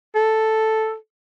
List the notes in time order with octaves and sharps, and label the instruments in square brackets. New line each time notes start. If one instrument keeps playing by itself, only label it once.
[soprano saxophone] A4